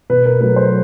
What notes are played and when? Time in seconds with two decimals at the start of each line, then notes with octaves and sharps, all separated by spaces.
0.10 B2 B4
0.25 A#4
0.40 F#3 A3 B4
0.56 C5